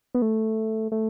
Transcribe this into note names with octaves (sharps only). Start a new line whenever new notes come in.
B3
A3
A3